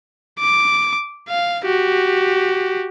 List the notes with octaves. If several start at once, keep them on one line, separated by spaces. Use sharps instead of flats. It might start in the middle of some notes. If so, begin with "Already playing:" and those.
D6
F5
F#4 G4